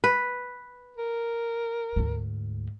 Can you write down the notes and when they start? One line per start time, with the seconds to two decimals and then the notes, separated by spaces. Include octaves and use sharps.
0.04 B4
0.97 A#4
1.96 D2 G#2